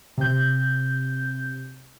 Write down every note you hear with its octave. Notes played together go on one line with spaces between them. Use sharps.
C3 G6